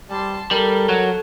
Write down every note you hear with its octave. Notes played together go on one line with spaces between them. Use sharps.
G3 A5 C6
G3 A4 A#4
F#3